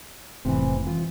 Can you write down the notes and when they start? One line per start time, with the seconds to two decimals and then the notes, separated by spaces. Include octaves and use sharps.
0.45 F1 A2 C3 E3
0.87 E3 F4